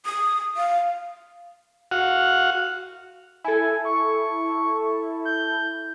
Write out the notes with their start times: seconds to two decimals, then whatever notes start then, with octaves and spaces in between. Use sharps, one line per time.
0.05 D#6
0.57 F5
1.91 F#4 F5 F#5
3.44 E4 A4 G#5
3.85 C#6
5.25 G6